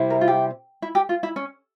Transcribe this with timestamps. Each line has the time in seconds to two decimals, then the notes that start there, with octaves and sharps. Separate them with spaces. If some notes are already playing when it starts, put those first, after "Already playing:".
Already playing: C3 G3 C4 E4
0.10 A#4
0.21 F4
0.28 G4
0.82 E4
0.95 G4
1.09 F4
1.23 E4
1.36 C#4